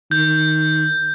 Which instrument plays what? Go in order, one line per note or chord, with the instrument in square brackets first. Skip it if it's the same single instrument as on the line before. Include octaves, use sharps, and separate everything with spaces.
[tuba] D#3 [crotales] G6